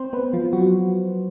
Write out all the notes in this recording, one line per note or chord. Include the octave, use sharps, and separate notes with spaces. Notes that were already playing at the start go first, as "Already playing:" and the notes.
Already playing: C4 C5
B3 B4
F3 F4
F#3 F#4